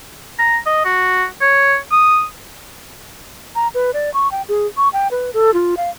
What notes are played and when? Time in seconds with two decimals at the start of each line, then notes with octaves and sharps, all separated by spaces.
0.39 A#5
0.66 D#5
0.85 F#4
1.42 C#5
1.92 D#6
3.55 A#5
3.74 B4
3.94 D5
4.14 C#6
4.32 G5
4.48 G#4
4.77 C#6
4.93 G5
5.11 B4
5.34 A4
5.54 F4
5.77 F5